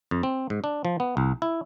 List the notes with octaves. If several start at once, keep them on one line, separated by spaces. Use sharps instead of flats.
F2
C4
G#2
D4
F3
B3
C2
E4